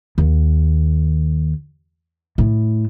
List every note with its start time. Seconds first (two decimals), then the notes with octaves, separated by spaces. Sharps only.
0.18 D#2
2.38 A2